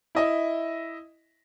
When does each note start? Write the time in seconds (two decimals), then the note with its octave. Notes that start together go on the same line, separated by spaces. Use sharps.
0.15 E4 D#5 E5